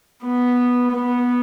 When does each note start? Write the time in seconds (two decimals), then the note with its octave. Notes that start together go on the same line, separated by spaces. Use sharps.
0.24 B3
0.92 B3